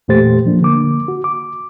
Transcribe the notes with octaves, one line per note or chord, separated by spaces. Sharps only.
E2 A#2 A3 G4 C5 A6
F3 A#3 D4
D3 A#3 D6
F#4
D6